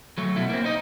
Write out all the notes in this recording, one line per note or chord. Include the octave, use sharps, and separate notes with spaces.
F#3 A3
B2 E4
A#3 C4
D#4 D#5